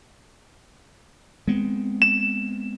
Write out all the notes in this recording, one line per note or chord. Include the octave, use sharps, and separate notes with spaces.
G#3 B3 C4
E7